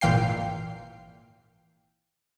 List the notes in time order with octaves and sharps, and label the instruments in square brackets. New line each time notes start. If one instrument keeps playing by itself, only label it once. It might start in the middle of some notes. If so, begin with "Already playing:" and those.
[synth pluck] G#1 A#2 E3 F5 G5 C7